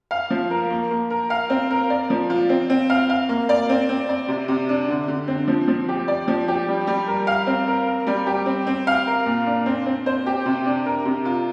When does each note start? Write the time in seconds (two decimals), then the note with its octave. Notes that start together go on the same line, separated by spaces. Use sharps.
0.11 F5
0.30 F3
0.51 A#4
0.70 A#3
0.90 A#3
1.10 A#4
1.30 F5
1.50 C4
1.71 A#4
1.90 D5
2.10 F3
2.30 F4
2.49 C4
2.70 C4
2.90 F5
3.10 F5
3.29 A#3
3.49 D5
3.69 C4
3.89 C4
4.09 D5
4.28 C3
4.48 C3
4.69 D4
4.88 D3
5.08 D3
5.28 C4
5.48 F3
5.68 F3
5.89 G4
6.08 D5
6.28 F3
6.48 G4
6.68 G3
6.87 G3
7.08 A#4
7.27 F5
7.47 C4
7.68 A#4
7.86 A#4
8.07 G3
8.27 G4
8.46 C4
8.67 C4
8.87 F5
9.07 A#4
9.26 A#2
9.46 D4
9.66 C4
9.86 C4
10.06 C5
10.26 G4
10.46 C3
10.66 D4
10.86 A#4
11.05 C3
11.25 F4